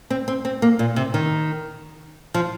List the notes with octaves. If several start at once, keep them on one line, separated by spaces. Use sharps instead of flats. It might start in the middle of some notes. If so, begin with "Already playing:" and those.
C4
C4
C4
A#3
A#2
C3
D#3
F3